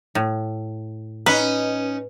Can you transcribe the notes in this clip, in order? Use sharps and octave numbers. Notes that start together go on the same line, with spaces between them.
A2
C#4 D#4 B4